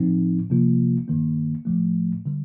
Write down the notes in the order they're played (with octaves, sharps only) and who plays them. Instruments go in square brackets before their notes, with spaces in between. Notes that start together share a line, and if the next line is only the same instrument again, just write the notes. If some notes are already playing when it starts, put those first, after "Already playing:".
Already playing: [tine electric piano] A2 F3 C4 D#4
C3 F3 A#3 F4
G2 D#3 A#3
A2 F3 A3
D3 G3